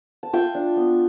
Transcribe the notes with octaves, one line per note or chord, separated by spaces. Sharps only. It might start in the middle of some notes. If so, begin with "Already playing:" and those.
A5
F4 E5 G5
D4
B3